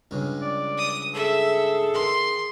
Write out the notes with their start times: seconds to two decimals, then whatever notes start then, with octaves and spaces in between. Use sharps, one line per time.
0.11 C#2 G2 C#3
0.42 D5
0.77 D#6
1.14 G#4 A4 E5
1.94 D#3 C6